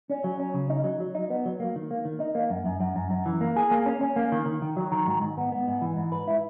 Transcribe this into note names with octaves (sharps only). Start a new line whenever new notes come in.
C#4
F#3
C#4
C#3
D#4
F#3
F#3
D#4
B3
F#3
A#3
D#3
A#3
D#3
D#4
A#3
F#2
F#2
F#2
F#2
F#2
E3
A#3
G#4
A#3
C#4
C#4
A#3
D#3
D#3
D#3
F#3
D#3
G#2
G#2
B3
B3
G#2
E3
G#2
B4
E4